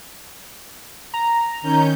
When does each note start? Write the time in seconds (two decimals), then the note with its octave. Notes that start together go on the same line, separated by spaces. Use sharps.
1.14 A#5
1.62 D#3 C#4 G6